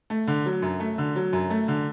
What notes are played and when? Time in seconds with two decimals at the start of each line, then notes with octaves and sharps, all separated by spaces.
0.10 A3
0.27 D3
0.46 F#3
0.62 F#2
0.80 A3
0.98 D3
1.16 F#3
1.33 F#2
1.50 A3
1.68 D3